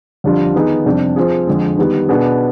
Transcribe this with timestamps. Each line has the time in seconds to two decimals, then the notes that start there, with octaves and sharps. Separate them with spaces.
0.24 F2 D3 G3 D4 F4
0.54 D#3 B3 D#4 G#4
0.86 F2 C3 G3 D4 G4
1.16 F3 C4 F4 G#4
1.47 F2 D3 G#3
1.78 D#3 G3 B3
2.09 B2 B3 D4 G#4